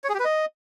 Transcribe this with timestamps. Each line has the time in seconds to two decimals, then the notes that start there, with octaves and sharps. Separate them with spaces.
0.04 C#5
0.09 G#4
0.14 G4
0.20 B4
0.25 D#5